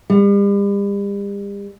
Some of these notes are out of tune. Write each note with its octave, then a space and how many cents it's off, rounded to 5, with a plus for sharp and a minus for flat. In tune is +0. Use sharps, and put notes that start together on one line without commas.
G3 +40